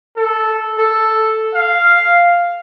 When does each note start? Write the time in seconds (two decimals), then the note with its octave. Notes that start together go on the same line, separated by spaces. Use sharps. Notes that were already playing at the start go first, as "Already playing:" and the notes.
0.16 A4
0.78 A4
1.54 F5